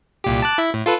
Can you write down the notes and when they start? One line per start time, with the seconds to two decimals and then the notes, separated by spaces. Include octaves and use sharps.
0.24 C2 A#2 G4
0.42 A5 D6 F#6
0.58 E4 E5
0.74 A2
0.86 F4 A4 B4